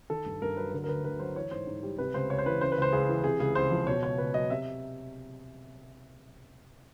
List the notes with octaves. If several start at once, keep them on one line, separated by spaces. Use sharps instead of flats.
D#3 A4
G2
G2 A#4
F#3 B4
D3 A#4
A#4
D2 B4
D2 B4
F#3 C5
E3 C#5
G#2 C5
G#2
G3
C3 B4
C#2 C5
C#2 C#5
C5
E3 B4
C#3 C5
B4
C#2 C5
C#2 G#4
E3
C3 G#4
C#2 G#4
C#2 C5
F3
B2 C#5
C#2 C#5
C#2 B4
F#3 D#5
C3 E5